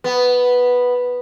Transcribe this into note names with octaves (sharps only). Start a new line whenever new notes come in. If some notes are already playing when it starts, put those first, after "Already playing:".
B3